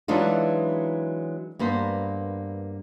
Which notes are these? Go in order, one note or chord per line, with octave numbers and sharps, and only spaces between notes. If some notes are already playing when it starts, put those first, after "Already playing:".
E3 F#3 G#3 D4 D#4 F4
G2 A#3 B3 C5